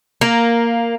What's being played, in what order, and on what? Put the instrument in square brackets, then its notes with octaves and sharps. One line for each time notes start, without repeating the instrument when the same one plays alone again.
[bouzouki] A#3